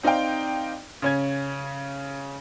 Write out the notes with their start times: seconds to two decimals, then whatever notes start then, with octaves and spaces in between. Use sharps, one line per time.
0.03 C4 D#4 D5 F5 G5
1.02 C#3 C#4 G#6